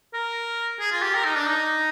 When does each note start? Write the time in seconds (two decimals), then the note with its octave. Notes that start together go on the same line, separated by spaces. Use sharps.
0.13 A#4
0.79 G#4
0.91 F4
1.02 G4
1.14 A#4
1.25 D#4
1.36 D4
1.47 D#4